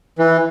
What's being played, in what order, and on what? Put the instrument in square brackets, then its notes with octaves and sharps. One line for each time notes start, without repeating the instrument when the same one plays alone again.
[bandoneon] E3